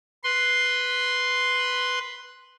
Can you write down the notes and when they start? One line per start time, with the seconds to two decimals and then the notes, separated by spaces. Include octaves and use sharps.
0.24 B4 C6